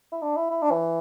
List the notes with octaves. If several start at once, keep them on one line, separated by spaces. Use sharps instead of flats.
E4
D4
E4
E4
D4
E3